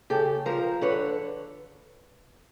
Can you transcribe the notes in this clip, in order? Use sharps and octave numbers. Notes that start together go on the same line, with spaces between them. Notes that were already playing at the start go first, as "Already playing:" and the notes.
C#3 G4 A4
F3 A#4 C5
D3 B4 C#5